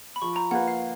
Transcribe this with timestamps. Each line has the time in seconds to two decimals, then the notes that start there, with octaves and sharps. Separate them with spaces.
0.16 B5
0.22 F3 C#6
0.36 A#5
0.51 A#3 F4 B4 F#5
0.68 F5